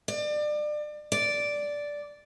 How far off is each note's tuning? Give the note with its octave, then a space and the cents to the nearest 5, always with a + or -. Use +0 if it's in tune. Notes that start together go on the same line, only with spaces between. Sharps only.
D5 +30
D5 -5